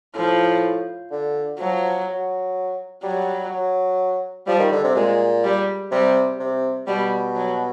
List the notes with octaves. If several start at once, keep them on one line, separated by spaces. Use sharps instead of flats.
A2 F3
D3
F3 F#3
F#3
F#3 G3
F#3
F3 G3
D#3
D3
C3
A#2 G#3
G3
C3 G3
C3
B2 G3
F#3